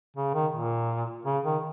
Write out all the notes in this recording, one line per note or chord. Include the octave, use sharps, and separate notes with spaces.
C#3
D#3
A#2
C#3
D#3